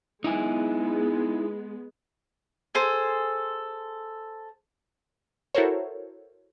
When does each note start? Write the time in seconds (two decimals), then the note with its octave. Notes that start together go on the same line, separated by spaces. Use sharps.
0.24 G#3 B3 D#4 E4 G#5
2.75 G#4 A4 C5
5.55 E4 F#4 A4 A#4 C5 C#5